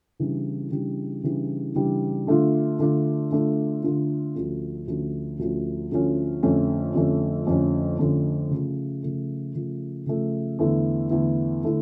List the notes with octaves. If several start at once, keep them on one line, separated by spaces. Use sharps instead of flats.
C#3 E3 G3 D4
C#3 E3 G3 D4
C#3 E3 G3 D4
C#3 E3 G3 D4
D3 A3 D4 F4
D3 A3 D4 F4
D3 A3 D4 F4
D3 A3 D4 F4
D2 D3 F3 A3 C#4
D2 D3 F3 A3 C#4
D2 D3 F3 A3 C#4
D2 D3 F3 A3 C#4
F2 D3 A3 C#4
F2 D3 A3 C#4
F2 D3 A3 C#4
F2 D3 A3 C#4
C#3 F3 A3
C#3 F3 A3
C#3 F3 A3
C#3 F3 A3
E2 D3 A3 E4
E2 D3 A3 E4
D3 A3 E4